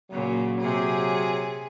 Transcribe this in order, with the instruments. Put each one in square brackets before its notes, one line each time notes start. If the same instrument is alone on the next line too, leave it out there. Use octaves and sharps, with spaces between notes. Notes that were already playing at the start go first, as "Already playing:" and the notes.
[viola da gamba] A#2 C#3 [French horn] F#3
[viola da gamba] C3 G#4